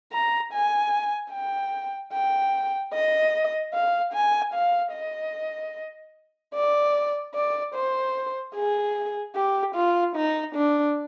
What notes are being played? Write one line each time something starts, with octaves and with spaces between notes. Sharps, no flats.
A#5
G#5
G5
G5
D#5
F5
G#5
F5
D#5
D5
D5
C5
G#4
G4
F4
D#4
D4